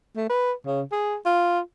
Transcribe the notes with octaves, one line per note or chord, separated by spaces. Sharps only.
A3
B4
C#3
G#4
F4